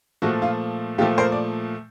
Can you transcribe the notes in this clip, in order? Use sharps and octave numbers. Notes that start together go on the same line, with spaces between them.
A#2 F3 A3 F#4
F4
A#2 F3 A3 F4 G4
A#4 C5
D5